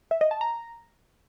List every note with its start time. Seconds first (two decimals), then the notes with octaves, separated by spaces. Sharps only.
0.11 E5
0.21 D#5
0.31 A5
0.41 A#5